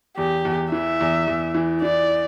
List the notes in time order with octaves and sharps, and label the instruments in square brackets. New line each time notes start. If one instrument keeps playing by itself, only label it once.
[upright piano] E2 [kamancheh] G4
[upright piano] E2
[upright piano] E3 [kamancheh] E5
[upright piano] E2
E2
E3
[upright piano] E3 [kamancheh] D5